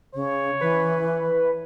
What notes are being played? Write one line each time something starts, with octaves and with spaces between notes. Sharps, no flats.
C#3 C#5
E3 B4